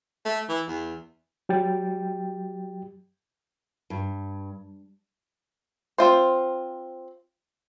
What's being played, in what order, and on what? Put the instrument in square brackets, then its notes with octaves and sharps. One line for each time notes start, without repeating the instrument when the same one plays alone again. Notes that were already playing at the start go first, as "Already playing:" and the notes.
[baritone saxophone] A3
E3
E2
[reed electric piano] F#3 G4 G5 A6
[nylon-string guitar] G2
[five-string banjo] C4 F4 C5